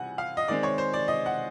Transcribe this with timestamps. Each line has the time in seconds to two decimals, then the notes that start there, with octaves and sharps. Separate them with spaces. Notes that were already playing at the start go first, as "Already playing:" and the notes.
Already playing: C3 E3 G3 F#5 G#5
0.18 F5
0.37 D#5
0.48 D#3 G#3 C4 D5
0.63 C#5
0.78 C5
0.93 D5
1.08 D#5
1.26 F#5